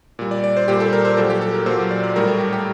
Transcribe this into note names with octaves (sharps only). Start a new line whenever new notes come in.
A#2 G3
D5
D5
C5
A#2 G3 G4
A4
A#4
C5
A#2 F#3 A4
G4
A4
A#4
A#2 F#3 C5
D5
D5
A2 G3 A#4
A4
G4
G4